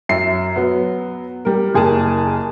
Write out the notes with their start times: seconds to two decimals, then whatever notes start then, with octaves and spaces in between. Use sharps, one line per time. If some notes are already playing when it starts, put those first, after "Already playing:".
0.09 F#2 E5 C7
0.56 F#3 B3
1.45 G3 A#4
1.74 F#1 G#4 A#4 A5